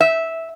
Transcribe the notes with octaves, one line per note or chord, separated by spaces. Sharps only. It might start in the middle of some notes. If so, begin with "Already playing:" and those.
E5